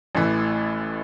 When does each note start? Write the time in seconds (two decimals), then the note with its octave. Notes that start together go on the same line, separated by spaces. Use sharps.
0.15 A1 A2 E3